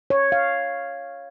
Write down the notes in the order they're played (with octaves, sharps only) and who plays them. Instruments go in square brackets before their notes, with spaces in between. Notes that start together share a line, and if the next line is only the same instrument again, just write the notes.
[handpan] C#5
F5